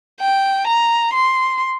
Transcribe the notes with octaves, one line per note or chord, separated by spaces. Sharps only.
G5
A#5
C6